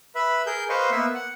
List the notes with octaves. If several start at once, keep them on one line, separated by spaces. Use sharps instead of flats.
B4 E5 B5
G#4 A#4 G6
B4 C5 D#5 F5 C#6
A#3 B3 B4 E5
F#5